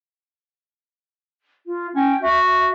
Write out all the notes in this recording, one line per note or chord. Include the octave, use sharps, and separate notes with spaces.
F4
C#4 G5
F#4 E5